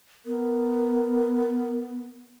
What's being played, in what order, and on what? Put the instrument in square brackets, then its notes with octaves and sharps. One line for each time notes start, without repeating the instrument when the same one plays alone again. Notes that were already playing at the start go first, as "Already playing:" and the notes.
[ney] B3 [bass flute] A#4